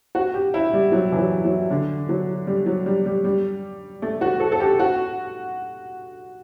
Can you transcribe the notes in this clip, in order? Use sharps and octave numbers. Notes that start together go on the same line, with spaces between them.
F#4
G4
E4
G3
F#3
E3
F#3
F#3
D3
F#3
G3
F#3
G3
G3
G3
A3
F#4
A4
A4
G4
F#4